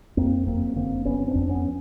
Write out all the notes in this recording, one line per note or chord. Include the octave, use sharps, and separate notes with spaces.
F2 A#3 C4
F#1 A#3 C4
D3 A#3 C4
F#1 B3 C#4
C4 D4
F2
B3 C#4